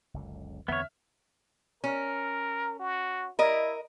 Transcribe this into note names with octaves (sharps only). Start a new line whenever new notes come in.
F#1 C#2 D3
E2 D3 B3 C4 C#5 E5 F6
C#4 A#4
F#4
E4 A#4 D#5